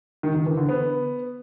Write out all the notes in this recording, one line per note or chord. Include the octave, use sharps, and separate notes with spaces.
D#3
D#3
E3
D3
B3